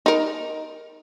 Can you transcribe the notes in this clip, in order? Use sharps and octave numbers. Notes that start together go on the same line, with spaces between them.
D#4 A#4